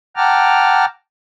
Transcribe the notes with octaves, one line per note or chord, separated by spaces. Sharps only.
F#5 G5 A5 A#5 D6 F6